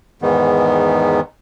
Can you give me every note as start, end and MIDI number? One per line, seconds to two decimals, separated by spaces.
0.22 1.20 40
0.22 1.20 44
0.22 1.20 51
0.22 1.20 59